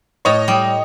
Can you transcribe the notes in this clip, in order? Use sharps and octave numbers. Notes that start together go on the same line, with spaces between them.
A2 C#5 D#5
G3